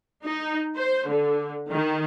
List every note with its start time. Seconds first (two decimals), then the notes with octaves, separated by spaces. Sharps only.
0.25 D#4
0.75 C5
1.07 D3
1.71 D#3